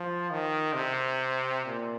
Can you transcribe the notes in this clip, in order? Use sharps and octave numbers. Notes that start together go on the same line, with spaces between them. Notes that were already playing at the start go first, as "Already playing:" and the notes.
Already playing: F3
D#3
C3
A#2